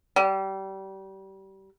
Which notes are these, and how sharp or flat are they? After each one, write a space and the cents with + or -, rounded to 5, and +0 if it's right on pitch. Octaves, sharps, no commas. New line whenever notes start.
G3 -25